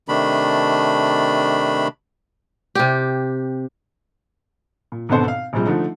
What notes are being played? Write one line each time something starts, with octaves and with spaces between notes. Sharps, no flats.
C3 D#3 A3 D4 B5
C3 G4
A#2
G#1 B2 D3 B3 A4 C5
F5
A#1 C3 F3 G3 G#3
D3 F3 A3 D#4